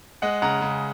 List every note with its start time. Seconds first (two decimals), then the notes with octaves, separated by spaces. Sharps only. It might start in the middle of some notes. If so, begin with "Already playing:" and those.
0.22 G#3 D#5 F#5
0.42 C#3 F#5 A#5
0.62 C#3